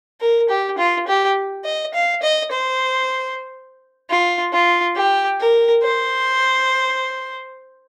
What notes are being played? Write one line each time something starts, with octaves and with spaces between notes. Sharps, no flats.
A#4
G4
F4
G4
D#5
F5
D#5
C5
F4
F4
G4
A#4
C5